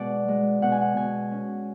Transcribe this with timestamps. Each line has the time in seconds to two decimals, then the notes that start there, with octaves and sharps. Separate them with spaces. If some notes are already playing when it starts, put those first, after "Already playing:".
Already playing: B2 G#3 D5 F#5
0.28 G#3
0.62 B2 F#5
0.72 G#5
0.81 F#5
0.97 B2 G#5
1.31 C#4